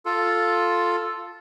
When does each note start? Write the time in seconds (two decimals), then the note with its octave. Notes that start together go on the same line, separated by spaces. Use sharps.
0.06 F4 A4